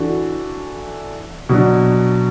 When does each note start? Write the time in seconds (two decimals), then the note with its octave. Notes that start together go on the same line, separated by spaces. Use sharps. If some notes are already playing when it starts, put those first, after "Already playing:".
Already playing: E3 D4 F#4 A4
1.49 B2 F#3 D4